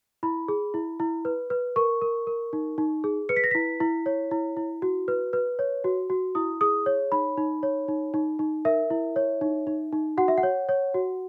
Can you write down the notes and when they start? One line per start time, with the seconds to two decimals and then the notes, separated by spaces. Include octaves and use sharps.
0.23 E4 B5
0.48 G#4
0.74 E4
1.00 E4
1.25 B4
1.50 B4
1.76 A#4 C#6
2.02 A#4
2.27 A#4
2.53 D#4
2.78 D#4
3.04 G#4
3.29 B4 C#7
3.36 B6
3.44 A#6
3.51 E4 B6
3.80 E4
4.06 C#5
4.31 E4
4.57 E4
4.82 F#4
5.08 B4
5.33 B4
5.59 C#5
5.84 F#4
6.10 F#4
6.35 E4 D#6
6.61 G#4 D#6
6.86 C#5
7.12 D#4 B5
7.37 D#4
7.63 C#5
7.88 D#4
8.14 D#4
8.39 D#4
8.65 A#4 E5
8.90 E4
9.16 C#5
9.41 D#4
9.67 D#4
9.93 D#4
10.18 F#4 F#5
10.28 E5
10.38 F#5
10.43 C#5
10.69 C#5
10.94 F#4